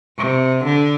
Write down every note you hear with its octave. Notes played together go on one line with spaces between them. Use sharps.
C3
D3